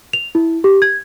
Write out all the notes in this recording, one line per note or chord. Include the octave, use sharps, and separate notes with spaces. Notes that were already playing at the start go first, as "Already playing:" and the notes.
F7
E4
G4
G#6